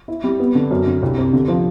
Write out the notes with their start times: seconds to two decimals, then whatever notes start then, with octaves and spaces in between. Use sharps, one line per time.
0.08 E4
0.24 G3
0.40 B3
0.55 D3
0.71 F#2
0.87 D3
1.02 C2
1.18 C3
1.33 D3
1.48 F3